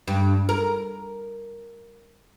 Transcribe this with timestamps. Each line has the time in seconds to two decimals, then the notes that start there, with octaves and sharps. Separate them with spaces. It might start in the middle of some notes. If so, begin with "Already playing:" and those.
0.08 G2
0.49 A#4